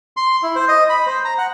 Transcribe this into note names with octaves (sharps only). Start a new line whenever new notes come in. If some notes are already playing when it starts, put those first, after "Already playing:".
C6
E4
C5
D#5
B5
C5
A#5
F#5